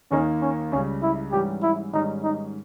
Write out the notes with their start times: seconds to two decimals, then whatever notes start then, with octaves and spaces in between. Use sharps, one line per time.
0.11 D#2 D#3 A#3 C#4 D#4
0.42 C#4
0.71 C#2 C#3 G3 C#4
1.02 E4
1.32 G#2 E3 G3 C#4 G4
1.63 E4
1.93 G#2 D#3 G3 C#4 D#4
2.23 D#4